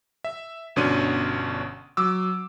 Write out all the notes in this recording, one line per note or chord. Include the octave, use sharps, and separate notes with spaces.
E5
G1 B2 C#4 D4 C6 D#7
F#3 D6 E6